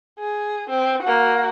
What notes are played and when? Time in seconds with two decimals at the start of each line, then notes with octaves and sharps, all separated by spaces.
0.19 G#4
0.70 C4
1.03 A#3 F#4